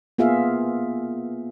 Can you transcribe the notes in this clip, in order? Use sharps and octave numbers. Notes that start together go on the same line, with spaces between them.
A#3 B3 F4 G#4 E5 F5